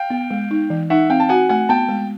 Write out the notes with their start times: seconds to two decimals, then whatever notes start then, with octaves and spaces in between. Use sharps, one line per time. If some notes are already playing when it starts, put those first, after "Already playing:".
Already playing: F5 G5
0.10 B3
0.31 G#3
0.51 D#4
0.70 E3
0.90 D#4 E5 F#5
1.10 C4 F5 G5
1.20 A5
1.29 F#4 F#5 G#5
1.49 A3 F#5 G#5
1.69 B3 G5 A5
1.89 G#3